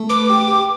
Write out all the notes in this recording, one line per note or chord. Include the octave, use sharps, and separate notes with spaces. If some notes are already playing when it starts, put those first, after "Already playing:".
Already playing: A3
B4 D6
G4
G4